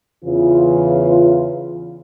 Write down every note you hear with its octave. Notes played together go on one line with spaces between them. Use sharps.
E2 C#3 E3 F4